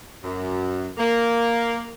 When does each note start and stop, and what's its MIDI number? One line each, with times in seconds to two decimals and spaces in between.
0.23 0.90 42
0.98 1.92 58